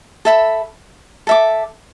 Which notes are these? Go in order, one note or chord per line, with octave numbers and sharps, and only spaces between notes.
A4 E5 B5
A4 E5 D6